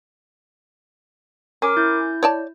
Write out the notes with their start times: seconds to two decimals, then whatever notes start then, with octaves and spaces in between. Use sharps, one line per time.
1.62 C#4 A#4 G#5 D6
1.77 E4 G6
2.23 C#5 D5 A5